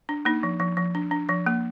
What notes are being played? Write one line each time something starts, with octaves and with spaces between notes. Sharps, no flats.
D4
A#3 D#4
F3
F3
F3
D4
D4
F3
A#3